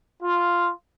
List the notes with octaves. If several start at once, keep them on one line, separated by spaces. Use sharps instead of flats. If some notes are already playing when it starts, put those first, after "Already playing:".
F4